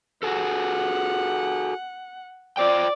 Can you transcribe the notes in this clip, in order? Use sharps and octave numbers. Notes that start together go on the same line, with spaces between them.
F#4 G#4 A4 F#5
F4 C5 D5 G5